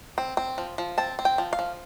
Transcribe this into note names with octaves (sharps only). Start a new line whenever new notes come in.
C4
C4
F3
F3
C4 A5
C4
G5
F3
F5
F3